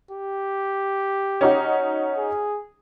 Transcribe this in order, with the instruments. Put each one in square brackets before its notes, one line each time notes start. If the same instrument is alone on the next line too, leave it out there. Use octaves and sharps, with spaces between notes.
[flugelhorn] G4
[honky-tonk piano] C#4 D#4 F#4
[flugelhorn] G#4